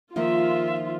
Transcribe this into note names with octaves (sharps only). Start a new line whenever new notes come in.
D#3 F3 A#3 F4 E5